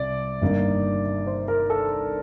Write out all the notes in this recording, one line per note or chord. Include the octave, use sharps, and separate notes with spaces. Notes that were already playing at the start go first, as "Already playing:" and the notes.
Already playing: C2 C3 D5
G1 G2 D#3 A#3 D#4
C5
A#4
A4